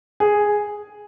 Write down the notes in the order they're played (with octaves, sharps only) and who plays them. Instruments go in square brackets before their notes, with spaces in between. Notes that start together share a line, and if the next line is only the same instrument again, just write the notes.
[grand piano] G#4